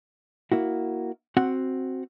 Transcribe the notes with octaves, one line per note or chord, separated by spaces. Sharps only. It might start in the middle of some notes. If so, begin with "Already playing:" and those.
A#3 E4 F#4
C4 F#4 F#5